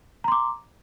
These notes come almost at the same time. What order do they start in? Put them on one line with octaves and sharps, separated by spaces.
A#5 C6 D6